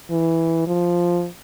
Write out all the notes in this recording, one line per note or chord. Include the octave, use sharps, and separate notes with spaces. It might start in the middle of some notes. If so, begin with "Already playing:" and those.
E3
F3